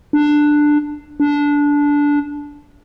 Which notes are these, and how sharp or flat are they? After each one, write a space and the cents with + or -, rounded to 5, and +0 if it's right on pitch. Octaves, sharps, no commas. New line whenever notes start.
D4 +10
D4 -15